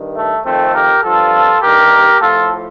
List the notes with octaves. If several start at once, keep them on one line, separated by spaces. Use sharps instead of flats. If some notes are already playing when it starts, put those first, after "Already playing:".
Already playing: G2 D#3
A3
F2 D#3 A3 C4
G4 A#4
G2 F3 F4 A4
G2 D#3 G4 A#4
A2 F3 F4 A4